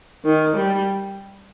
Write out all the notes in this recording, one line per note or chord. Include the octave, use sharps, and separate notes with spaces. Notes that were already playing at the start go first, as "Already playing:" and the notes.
D#3
G3